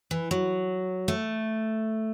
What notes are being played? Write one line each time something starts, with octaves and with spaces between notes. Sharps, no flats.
E3
F#3
A3